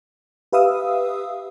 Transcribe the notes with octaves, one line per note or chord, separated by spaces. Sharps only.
G4 B4 E5 F5 D#6 E6